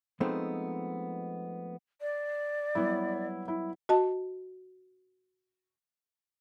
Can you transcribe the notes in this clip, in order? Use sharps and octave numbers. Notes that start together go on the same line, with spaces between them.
F3 G#3 A3 B3 C4 D#4
D5
F#3 G3 B3 E4
E4
F#4 D#5 A5